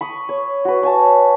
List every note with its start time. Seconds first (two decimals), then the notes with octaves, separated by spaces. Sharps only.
0.01 B5 C#6 D#6
0.29 C#5
0.65 F#4 B4
0.83 C#5 G#5 A5